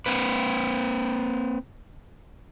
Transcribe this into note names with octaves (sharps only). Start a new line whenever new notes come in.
A#3 C4 B4